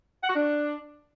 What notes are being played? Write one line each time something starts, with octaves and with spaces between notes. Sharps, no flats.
F#5
F#4
D4